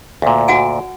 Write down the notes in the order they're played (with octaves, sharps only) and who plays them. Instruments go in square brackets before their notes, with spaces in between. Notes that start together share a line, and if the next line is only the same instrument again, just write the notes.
[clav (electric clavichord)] D2 A#2
[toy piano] F#4 F#5 G#5